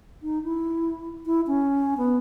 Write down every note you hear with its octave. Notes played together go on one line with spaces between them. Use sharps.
D#4
E4
E4
C#4
B3